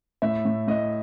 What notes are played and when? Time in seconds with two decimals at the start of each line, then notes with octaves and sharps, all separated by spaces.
0.22 A2 E5
0.45 A2
0.68 A2 D#5